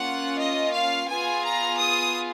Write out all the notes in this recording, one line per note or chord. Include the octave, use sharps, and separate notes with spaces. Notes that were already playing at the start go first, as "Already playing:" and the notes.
Already playing: A#3 C#4 F4 F#5
D#5
F5
B3 F4 G#4 G#5
A#5
D#6